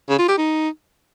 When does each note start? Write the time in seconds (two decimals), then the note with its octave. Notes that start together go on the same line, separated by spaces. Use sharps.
0.09 C#3
0.19 F4
0.28 G4
0.38 D#4